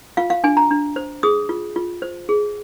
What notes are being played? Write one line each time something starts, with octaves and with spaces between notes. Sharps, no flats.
F4 F5
F5
D4 G#5
A#5
D4
C5
G#4 D#6
F4
F4
C5
G#4